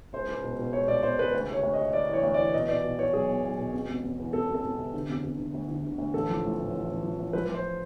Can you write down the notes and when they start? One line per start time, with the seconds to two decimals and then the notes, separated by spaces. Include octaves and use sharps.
0.13 C#2 C5
0.28 C#2
0.44 B2
0.59 B2
0.73 C#2 C#5
0.88 B2 D5
1.03 B2 C5
1.19 C#2 B4
1.34 D2
1.49 C3 C#5
1.63 D2
1.73 D#5
1.79 C3
1.93 C3 D5
2.09 E3 C#5
2.23 D2
2.34 D5
2.39 E3
2.54 B2 D#5
2.69 B2 D5
2.84 B2
2.99 B2 C#5
3.13 B1 G#4
3.29 B1
3.44 B1
3.58 B2
3.74 E1
3.89 E1
4.04 E1
4.19 E2
4.33 E1 A4
4.49 E1
4.54 A4
4.63 E1
4.78 C3
4.93 D3
5.09 E1
5.24 E1
5.38 D3
5.54 D2
5.68 D3
5.84 D3
5.98 D2
6.13 A1 A4
6.29 F3
6.44 A2
6.59 A1
6.74 A1
6.89 A1
7.04 F3
7.19 A1
7.33 F3 B4
7.48 F3
7.54 C5